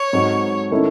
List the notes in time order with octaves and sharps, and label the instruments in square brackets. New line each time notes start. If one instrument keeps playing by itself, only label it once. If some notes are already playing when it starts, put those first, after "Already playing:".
Already playing: [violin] C#5
[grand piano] G#2 F#3 C4 D#4 A4
D#3 A3 C#4 E4